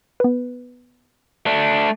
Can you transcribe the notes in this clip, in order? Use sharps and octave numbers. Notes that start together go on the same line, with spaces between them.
B3 B4
A3 D4